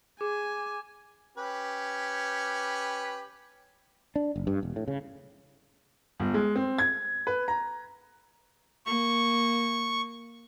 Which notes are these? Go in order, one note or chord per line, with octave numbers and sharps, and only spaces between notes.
G#4 G#5 D6
C#4 G4 B4
D4
F#1
G2
E1
A2
C#3
G1
G#3
C4
G#6
B4
A#5
A#3 C#6